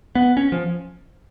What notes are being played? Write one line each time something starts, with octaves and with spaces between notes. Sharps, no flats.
B3
C#4
F3